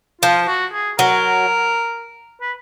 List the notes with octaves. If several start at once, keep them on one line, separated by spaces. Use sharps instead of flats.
F3 F4
F#4
G#4
F#3 A#4
B4